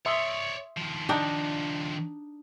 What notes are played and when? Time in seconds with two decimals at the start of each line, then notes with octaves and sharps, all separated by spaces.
0.06 C#5 D5 E5 C6 D#6
0.77 D#3 F3
1.09 D4 D#4 G5